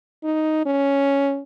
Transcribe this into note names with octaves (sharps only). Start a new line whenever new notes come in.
D#4
C#4